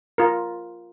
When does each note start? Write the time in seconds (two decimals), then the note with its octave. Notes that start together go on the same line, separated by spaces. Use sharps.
0.18 F4 A#4